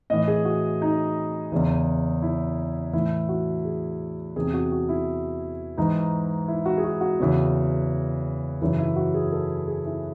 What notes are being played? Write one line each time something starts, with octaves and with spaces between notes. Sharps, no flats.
A2 E3 D#5
G#4
F#4
D#4
E2 C#3 E3
E4
A2 E3 E4
F#4
G#4
E2 C3 E3 G#4
F#4
F#4
E4
G#2 E3 D#4
E4
F#4
G#4
F#4
F#4
E2 C#3 E3
F#2 C#3 E3 E4
E4
F#4
G#4
A4
G#4
E4